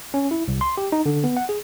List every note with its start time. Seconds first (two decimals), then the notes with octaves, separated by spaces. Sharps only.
0.14 C#4
0.31 E4
0.48 C2
0.61 C6
0.77 G4
0.92 D#4
1.06 D3
1.24 B3
1.37 F#5
1.49 G#4